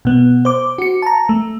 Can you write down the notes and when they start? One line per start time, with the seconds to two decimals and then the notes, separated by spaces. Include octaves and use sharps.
0.05 B2 B3
0.45 C5 D6
0.78 F#4 C#7
1.02 A5 A#5
1.29 A3